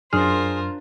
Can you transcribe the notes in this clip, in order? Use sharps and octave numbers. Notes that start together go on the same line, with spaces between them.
F#2 D4 F4 G#4 A#4 C5 F6